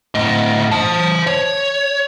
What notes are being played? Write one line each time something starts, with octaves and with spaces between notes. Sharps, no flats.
A2 D#5
C5 A5
C#5